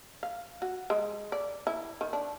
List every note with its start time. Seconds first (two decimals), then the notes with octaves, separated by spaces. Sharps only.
0.23 F5
0.62 F#4
0.90 G#3
1.32 D5
1.67 E4
2.01 D#3
2.13 D4